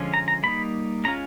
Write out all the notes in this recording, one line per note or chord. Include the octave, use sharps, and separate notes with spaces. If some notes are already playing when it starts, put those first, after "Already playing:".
Already playing: D3 F3 G#3 C#4 F4
A#5
A#5
G3 A#3 D#4 B5
G#3 C#4 F4 A#5